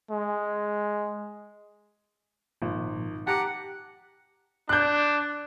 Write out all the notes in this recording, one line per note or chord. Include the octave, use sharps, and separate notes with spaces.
G#3
G#1 A#2 F3
G4 F#5 A5 A#5 D6
D4 F#6 G6